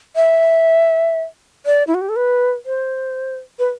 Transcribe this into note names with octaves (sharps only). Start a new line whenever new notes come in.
E5
D5
E4
F#4
G4
A4
B4
C5
B4